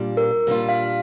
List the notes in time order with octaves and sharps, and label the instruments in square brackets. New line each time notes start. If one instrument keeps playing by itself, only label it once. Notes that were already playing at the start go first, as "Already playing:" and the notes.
Already playing: [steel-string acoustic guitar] A#2 G3 D4 F4
[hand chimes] A#4
[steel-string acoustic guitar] A#2 G3 D4 F4
[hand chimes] F5